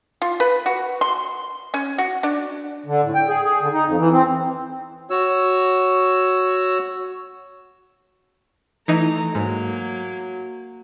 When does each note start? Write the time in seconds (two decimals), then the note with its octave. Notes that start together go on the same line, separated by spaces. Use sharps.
0.22 F4
0.40 B4
0.66 F#4
1.01 C6
1.74 C#4
1.98 F#4
2.23 D4
2.86 D3
3.03 A2
3.15 G5
3.28 G#4
3.43 G#4
3.61 D3
3.72 D#4
3.85 F2
3.97 E3
4.12 C4
5.10 F#4 C#5 E6
8.88 E3 A3 D#4 A#5
9.35 G#2 F#3 A#3